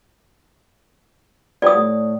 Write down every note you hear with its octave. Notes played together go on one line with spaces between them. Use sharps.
F3 G3 B3 D5 D#6
A2